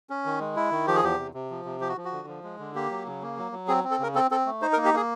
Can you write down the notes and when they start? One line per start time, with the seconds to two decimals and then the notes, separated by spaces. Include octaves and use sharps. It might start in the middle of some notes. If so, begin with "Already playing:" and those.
0.10 C#4
0.26 D#3
0.40 G#3
0.56 E4
0.71 D#3
0.87 F3 G4
0.96 G#4
1.03 E2 G4
1.18 C3
1.34 C3
1.50 F3
1.65 C3
1.80 F3 G4
1.89 F#4
1.97 F3
2.05 F#4
2.12 D3
2.28 F3
2.44 G#3
2.59 D3
2.75 A#3 G4
2.91 F#3
3.06 C#3
3.22 A#3
3.37 F#3
3.52 F#3
3.68 C4 G#4
3.84 C4
3.91 A4
3.99 C#3 A#4
4.15 C4 A4
4.31 C4 A4
4.46 A3
4.62 D#4 C5
4.73 A#4
4.77 A#3
4.85 G4
4.93 A#3 G#4